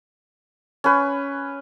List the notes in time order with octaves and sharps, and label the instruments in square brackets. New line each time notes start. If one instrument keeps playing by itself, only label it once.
[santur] C#4 B4